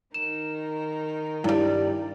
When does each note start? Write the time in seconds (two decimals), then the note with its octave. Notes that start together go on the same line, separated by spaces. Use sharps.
0.14 D#3 D#4 A#4 E7
1.44 G2 G3 E4 D5